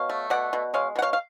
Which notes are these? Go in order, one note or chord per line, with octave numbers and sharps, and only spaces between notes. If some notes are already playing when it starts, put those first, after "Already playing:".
Already playing: B2 C#5 F5
A3
B2 D5 F#5
B2
G#3 C#5 F5
B2 F#5
C#5 F5
F5